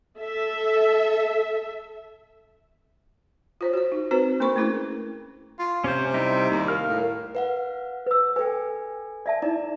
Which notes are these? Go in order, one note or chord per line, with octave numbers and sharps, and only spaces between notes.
A4 E5
F4 C5 C#5
F#4 C5
D#4
C4 F#4 B4 C5
A#3 D4 A#4 C5 B5 C#6
A3 C#4 E4 G#4 A#4
F4
C3 C#4 C5
G3 D#4 E4
D#2
A#4 F5 F6
A2
B4 F5 F#5
B4 E6
A4 B4 G5 G#5
D5 E5 A5
D#4 E4 D5